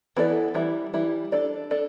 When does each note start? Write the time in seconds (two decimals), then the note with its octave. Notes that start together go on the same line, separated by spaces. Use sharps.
0.16 E3 B3 E4 A4 D5
0.55 E3 G3 E4
0.94 E3 G3 E4
1.32 D4 A4 D5
1.71 D4 A4 D5